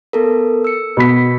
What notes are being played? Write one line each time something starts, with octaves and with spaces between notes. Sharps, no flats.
B3 A4 A#4
E6 C#7
B2 B5 B6